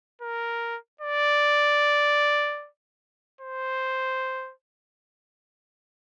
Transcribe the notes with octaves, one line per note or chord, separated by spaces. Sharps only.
A#4
D5
C5